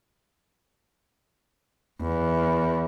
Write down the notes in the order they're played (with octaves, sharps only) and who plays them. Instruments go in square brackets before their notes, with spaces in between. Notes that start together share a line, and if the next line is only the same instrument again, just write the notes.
[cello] E2